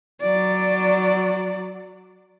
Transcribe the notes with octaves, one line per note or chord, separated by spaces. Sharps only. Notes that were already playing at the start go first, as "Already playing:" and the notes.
F#3 D5